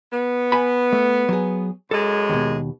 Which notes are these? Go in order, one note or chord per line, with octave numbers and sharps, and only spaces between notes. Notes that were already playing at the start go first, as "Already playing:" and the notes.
B3
G#5 B5
A3
F#3 G#4
F#2 G#3 A4
D#2 B2